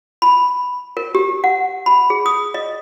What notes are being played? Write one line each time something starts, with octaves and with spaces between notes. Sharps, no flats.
B5
A#4
G4
F#5
B5
G#4
D#6
D#5